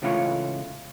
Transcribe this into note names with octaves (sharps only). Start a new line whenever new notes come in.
C#2 A2 E3 F4 A4 C#5